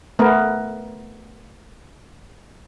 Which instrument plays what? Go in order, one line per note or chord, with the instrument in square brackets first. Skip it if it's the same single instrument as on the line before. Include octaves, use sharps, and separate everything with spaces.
[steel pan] A3 B3 A#4